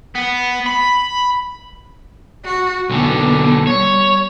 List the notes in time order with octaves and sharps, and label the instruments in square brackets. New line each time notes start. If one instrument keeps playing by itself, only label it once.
[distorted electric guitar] B3
B5
[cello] F#4
[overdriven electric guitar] B1 D3 [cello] A#3 B3
[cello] G3 [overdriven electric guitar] C#5